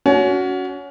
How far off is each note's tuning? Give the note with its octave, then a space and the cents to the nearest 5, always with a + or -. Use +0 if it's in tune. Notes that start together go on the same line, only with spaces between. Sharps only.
C#4 +25 F#4 +0